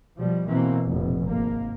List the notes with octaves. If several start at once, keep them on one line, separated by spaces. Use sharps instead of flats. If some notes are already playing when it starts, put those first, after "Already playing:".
B2 F3 G3
B2 E3 A#3 C4
F1 A#1
G#1 A#3